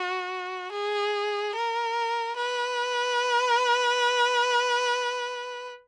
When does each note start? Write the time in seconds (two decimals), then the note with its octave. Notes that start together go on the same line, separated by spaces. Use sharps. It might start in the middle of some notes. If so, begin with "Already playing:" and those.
Already playing: F#4
0.72 G#4
1.55 A#4
2.37 B4